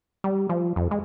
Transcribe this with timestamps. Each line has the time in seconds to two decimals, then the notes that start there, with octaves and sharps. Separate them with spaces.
0.24 G3
0.49 F3
0.76 F2
0.91 G#3